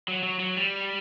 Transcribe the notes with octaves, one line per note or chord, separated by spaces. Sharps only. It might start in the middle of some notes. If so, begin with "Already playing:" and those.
F#3
F#3
F#3
G3